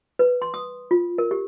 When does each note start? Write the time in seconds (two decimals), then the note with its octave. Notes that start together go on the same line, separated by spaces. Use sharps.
0.19 B4
0.42 C6
0.54 D#6
0.91 F4
1.18 A#4
1.31 G4